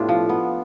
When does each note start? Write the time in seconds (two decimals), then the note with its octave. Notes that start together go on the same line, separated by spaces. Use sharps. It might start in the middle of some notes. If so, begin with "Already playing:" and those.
Already playing: A2 B3 D4 F4 G4
0.09 F3
0.29 B3